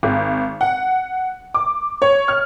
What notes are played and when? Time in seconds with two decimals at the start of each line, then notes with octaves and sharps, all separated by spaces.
0.03 G#1
0.61 F#5
1.54 D6
2.02 C#5
2.28 F6